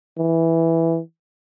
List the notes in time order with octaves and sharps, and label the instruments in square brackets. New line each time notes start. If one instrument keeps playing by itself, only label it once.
[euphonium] E3